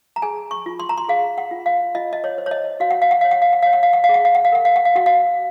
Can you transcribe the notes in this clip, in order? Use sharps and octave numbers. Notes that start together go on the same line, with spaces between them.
A#5
G#4 G#5
C#6
F4
C6
A#5
C6
G#4 F5
F#5
F4
F5
F4 D#5
D#5
C#5
C5
C#5
D#5
F#4 F5
F#5
F5
F#5
C#5 F5
F#5
F5
F#5
C#5 F5
F#5
F5
F#5
F5
G#4
F#5
F5
F#5
F5
A#4 F#5
F5
F#5
F5
F#4 F#5
F5